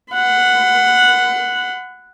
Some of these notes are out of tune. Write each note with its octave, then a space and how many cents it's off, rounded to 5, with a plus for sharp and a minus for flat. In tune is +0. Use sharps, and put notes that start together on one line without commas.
F#5 -5 B5 +35